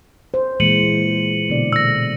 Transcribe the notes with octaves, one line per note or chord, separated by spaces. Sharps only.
C5
A#2 E3 G#3 C#7 D#7 F#7
B2 D3 D5
A#2 E6 A#6